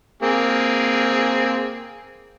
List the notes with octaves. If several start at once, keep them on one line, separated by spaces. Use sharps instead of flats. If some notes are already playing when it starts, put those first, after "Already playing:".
A#3 C4 G#4